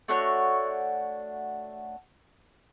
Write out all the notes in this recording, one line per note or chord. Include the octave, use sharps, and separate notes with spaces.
A3 D4 F#4 C#5